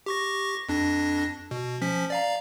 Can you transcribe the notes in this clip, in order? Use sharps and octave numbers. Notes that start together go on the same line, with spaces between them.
G4 C#6 A#6
F2 D4 A#6
B2
F3 C#4 B6
D5 F5 A#5